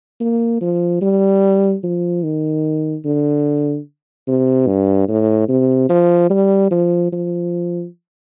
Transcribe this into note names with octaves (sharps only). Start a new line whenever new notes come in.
A#3
F3
G3
F3
D#3
D3
C3
G2
A2
C3
F3
G3
F3
F3